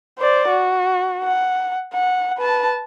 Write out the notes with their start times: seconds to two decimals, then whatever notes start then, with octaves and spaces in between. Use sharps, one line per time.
0.19 C5 D5
0.49 F#4
1.24 F#5
1.94 F#5
2.38 B4 A5